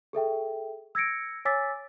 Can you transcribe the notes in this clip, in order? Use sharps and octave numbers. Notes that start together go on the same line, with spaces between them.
G#4 A4 E5 G5
E6 G#6 A#6 C#7 D7
C#5 G#5 D6 E6 A6 B6